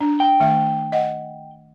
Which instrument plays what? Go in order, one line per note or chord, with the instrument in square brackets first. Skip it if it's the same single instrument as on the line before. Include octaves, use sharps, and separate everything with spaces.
[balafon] D4
[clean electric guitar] G5
[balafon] D#3 A3 E5
D#5 F#5